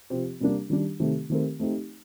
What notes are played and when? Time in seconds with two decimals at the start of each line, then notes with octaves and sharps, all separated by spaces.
0.10 C3 F3 C4 G4
0.40 C3 G3 A#3 D4
0.70 D#3 G3 D4
1.00 C3 D#3 A3 C4 G4
1.30 D#3 A3 C4 G4 A#4
1.60 A3 C4 D#4 G4